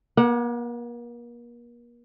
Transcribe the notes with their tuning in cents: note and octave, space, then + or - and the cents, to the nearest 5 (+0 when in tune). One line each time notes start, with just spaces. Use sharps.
A#3 +40 F#5 +0